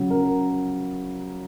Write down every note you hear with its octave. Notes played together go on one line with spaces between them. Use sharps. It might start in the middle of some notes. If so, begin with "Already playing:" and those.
Already playing: C#3 F#3
A#4